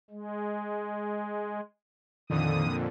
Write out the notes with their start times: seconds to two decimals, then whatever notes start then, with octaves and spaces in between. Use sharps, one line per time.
0.10 G#3
2.30 F2 A#2 D3 D#3 D#6